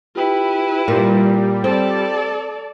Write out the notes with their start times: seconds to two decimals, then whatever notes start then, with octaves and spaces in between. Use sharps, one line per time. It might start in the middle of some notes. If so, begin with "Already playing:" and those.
0.15 E4 F4 G4 B4 G5
0.88 A#2 G3
1.64 C4 A4 D5